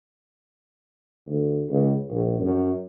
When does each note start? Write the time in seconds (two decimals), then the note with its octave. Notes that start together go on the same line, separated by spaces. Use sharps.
1.27 D2
1.69 C#2
2.09 A#1
2.40 F#2